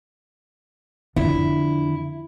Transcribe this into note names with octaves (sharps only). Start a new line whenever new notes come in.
F2 D3 E4